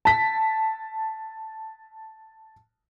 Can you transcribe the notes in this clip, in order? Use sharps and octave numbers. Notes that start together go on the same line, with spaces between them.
A5 B6